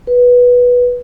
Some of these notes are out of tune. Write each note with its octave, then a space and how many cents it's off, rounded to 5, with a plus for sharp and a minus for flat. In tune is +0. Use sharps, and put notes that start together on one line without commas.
B4 -10